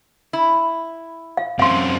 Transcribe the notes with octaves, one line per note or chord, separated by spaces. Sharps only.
E4
F5
F#2 C3 F5 C6